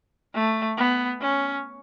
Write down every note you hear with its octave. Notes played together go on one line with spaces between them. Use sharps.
A3
B3
C#4